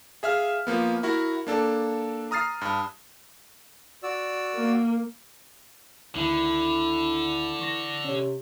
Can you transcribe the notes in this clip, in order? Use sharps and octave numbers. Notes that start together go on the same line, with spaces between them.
G#4 E5 F5 F6
F3 A#3 B3
E4 F#4 A#4
A#3 D4 A4
A#5 D#6 F6 A6 C7
G2 A5
F#4 D5 E6
A#3
D2 D3 D#3 E4
E3 C#6 A#6
C3 C#4 C#5